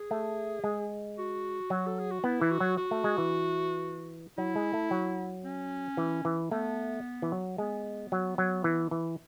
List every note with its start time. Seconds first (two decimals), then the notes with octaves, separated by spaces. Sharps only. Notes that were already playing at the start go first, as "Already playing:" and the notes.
Already playing: G#4
0.11 A3
0.64 G#3
1.18 F#4
1.70 F#3
1.86 A4
1.99 G#4
2.11 F#4
2.24 B3 E4
2.41 E3
2.51 F#4
2.60 F#3
2.77 F#4
2.91 A3
3.04 G#3
3.18 E3
4.38 F#3 E4
4.56 G#3
4.74 A3
4.91 F#3
5.45 C#4
5.97 E3
6.25 E3
6.51 A3 B3
7.22 E3
7.32 F#3
7.58 G#3 B3
8.12 F#3
8.38 F#3
8.64 E3
8.91 E3